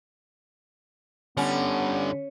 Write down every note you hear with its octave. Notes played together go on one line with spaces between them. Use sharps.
D3 G3 B3 C#4